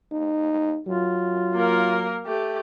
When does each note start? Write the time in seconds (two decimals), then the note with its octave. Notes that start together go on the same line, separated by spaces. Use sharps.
0.12 D#4
0.87 F#3 F4
1.54 A#3 A#4
2.26 A3 G4